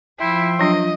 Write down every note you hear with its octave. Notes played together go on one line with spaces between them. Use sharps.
F3 E4 E5 G5 C6
F#3 D4 F4 D#5